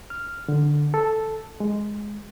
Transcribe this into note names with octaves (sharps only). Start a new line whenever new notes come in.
F6
D3
A4
G#3